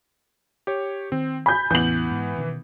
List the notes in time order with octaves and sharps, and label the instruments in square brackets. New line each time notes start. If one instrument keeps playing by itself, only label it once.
[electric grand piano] G4 C#5
[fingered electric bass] D#3 [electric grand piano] C4
[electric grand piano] G#5 [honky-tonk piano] B5 G6
[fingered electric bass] E2 A2 C#3 [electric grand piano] E3 B3 [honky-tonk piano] G6 F#7
[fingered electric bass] G#2
B2 D#3